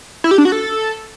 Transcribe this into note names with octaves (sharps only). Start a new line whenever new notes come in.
E4
G4
D4
F#4
A4